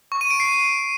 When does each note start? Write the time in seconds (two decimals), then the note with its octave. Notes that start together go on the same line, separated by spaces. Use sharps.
0.12 C#6
0.21 D#7
0.30 D7
0.40 C7